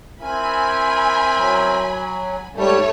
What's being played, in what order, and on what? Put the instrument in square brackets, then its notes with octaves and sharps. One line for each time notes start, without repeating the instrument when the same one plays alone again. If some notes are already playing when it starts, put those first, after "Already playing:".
[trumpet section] C4 E4 A#4 [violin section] G#5 B5
[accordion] F#3
[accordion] G#2 G3 [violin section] A3 C#5